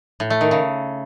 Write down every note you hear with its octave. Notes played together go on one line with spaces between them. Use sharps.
A2
A3
D#3
C#3